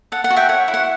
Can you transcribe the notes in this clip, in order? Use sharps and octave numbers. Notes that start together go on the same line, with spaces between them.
A4 F#5
F#5
F#4
E5 G5
C#5 F#5
E4
F#5